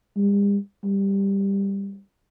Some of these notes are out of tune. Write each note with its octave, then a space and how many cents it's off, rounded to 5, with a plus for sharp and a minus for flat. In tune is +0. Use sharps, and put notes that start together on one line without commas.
G3 +45
G3 +10